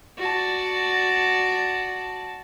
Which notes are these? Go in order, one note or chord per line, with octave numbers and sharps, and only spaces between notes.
F#4 D5 A5